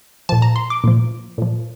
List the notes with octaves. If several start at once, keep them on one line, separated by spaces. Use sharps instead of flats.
A#2 F3 A5
A#5
C6
D6
A#2 F3
A#2 F3